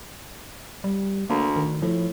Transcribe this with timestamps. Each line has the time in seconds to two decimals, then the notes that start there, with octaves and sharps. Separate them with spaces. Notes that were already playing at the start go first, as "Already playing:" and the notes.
0.84 G3
1.30 D2 A#3
1.56 D#3
1.82 A2 F3